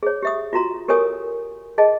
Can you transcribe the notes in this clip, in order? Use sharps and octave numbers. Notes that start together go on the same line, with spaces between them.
G#4 C#5
G4 E5 D#6
F4 F#4 A#5 C6
G4 A4 A#4 C#5 G#5 D#6
G#4 D#5 A5